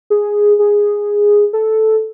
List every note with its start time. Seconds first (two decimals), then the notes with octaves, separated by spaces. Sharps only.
0.10 G#4
0.59 G#4
1.53 A4